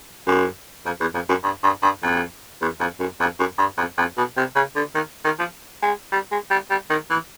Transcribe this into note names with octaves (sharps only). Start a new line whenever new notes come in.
F#2
F2
E2
F2
F#2
G2
G2
G2
F2
E2
F2
F#2
F2
F#2
G2
F2
F2
B2
C3
C#3
D3
D#3
D#3
F3
G#3
G3
G#3
G3
G3
D#3
E3